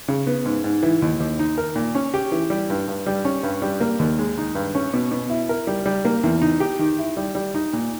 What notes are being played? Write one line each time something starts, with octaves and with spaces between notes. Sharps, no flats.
C#3
B3
G#2
G#2
E3
D#2
D#2
D#4
A#4
A#2
C#4
G4
E3
G3
G2
G2
G3
C#4
G2
G3
A#3
D#2
G#3
D#4
G2
C#4
B2
B2
E4
A#4
G3
G3
A#3
E2
D#4
G4
D#3
E4
G3
G3
D#4
A#2